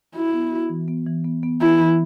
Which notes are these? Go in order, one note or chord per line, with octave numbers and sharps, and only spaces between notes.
E4 F#4
B3
F#4
E3
B3
E3
B3
B3
E3 E4
E3